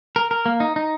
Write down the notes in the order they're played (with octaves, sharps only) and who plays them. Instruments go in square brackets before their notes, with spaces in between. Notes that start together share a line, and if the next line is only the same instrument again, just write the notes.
[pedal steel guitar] A#4
A#4
A#3
D#4
D#4